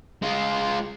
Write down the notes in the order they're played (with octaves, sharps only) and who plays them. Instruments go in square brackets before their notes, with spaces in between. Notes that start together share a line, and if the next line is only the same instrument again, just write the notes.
[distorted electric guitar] G#3 F4